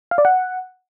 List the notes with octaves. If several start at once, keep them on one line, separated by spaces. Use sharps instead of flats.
F5
D5
F#5